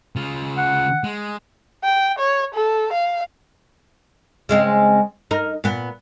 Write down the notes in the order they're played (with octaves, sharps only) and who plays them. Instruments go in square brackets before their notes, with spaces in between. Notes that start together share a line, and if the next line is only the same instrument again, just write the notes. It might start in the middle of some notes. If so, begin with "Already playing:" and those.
[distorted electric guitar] C#3 F4
[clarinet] F#5
[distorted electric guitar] G#3
[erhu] G5
C#5
A4
F5
[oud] C#3 G#3 C4
D#4 A#4
A#2 B3